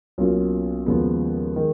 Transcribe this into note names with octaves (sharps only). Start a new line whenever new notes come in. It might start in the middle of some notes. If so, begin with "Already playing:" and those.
B1 B2 A#3 C#4 F4
D#2 C#3 F3 G#3 B3
D#3 G#3